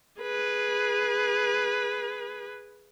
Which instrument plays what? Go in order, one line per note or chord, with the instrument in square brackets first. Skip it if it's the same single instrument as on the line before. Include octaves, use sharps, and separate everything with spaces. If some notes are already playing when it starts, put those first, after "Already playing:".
[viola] G#4 B4